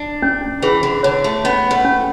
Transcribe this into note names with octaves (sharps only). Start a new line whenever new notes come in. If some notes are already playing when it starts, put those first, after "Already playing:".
Already playing: D4
C#4
E3 G#4
D3
D3 C#5
A3
B3 C#4
A3
C#4